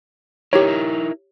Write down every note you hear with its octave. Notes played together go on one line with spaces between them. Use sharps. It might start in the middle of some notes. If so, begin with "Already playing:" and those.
D#4 E4 G4 A#4 C#5